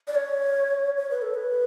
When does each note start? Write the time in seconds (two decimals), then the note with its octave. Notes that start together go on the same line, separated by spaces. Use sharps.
0.08 D5
0.15 C#5
0.97 C#5
1.11 B4
1.22 A4
1.34 B4